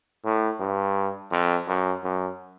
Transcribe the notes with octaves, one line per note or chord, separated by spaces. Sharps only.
A2
G2
F2
F#2
F#2